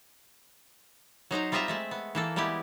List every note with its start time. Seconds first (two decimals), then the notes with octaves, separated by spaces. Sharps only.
1.31 F#3 D#4 C5 A#5
1.52 G3 C4 F4 D#5 E5 A#5
1.68 G#3 A3 E5
1.91 B3
2.15 E3 A#3 A4
2.36 G3 G#3 B3 E4 G4